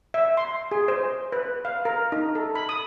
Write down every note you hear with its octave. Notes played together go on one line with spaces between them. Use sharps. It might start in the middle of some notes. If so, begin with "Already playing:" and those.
E5
C6
G#4
C5
B4
F5
A#4
D#4
A4
B5
D#6